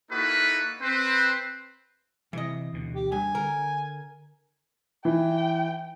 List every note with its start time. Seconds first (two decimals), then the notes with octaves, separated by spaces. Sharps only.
0.11 A#3 D#4 E4 F#4 A4 B4
0.82 C4 B4 C5
2.33 C3 E3 D#5
2.73 D2 B2
2.95 G4
3.12 G2 G#5
3.35 D3 A#4
5.05 E3 G5